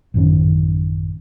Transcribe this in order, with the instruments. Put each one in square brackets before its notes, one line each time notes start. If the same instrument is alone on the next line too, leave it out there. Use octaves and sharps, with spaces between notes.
[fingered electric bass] A1 F#2 D#3 C#4